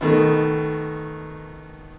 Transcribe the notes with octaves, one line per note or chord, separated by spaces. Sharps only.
B2 D#3 A3